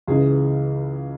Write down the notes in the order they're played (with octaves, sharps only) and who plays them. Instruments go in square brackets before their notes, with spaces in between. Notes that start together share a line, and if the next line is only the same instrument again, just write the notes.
[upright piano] C#2 C#3 E3 G#4